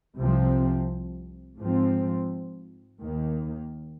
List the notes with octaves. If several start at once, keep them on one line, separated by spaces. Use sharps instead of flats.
C2 C3 F3 C4
G#2 F3 C4
D#2 D#3 A#3